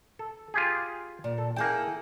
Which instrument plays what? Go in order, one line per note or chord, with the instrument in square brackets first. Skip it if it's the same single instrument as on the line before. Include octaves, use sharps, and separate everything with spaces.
[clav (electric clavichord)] A4
F4 G4 G#4
[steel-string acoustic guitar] A#2
[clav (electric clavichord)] A4
[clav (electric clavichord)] A#3 G5 [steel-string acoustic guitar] E4 G#4 A4